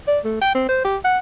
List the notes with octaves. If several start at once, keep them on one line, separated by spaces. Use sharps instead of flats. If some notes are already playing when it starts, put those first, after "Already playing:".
D5
A3
G5
C4
C5
G4
F#5